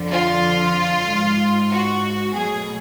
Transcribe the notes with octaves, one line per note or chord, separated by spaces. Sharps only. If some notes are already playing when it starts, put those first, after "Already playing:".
Already playing: F2 D3 F3
F4
G#2 G#3
F#4
B2 F#3 A3 G#4